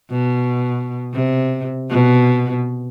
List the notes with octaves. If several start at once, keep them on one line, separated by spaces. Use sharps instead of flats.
B2
C3
B2